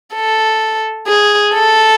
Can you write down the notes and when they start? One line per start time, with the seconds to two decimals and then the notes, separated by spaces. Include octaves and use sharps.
0.14 A4
1.07 G#4
1.54 A4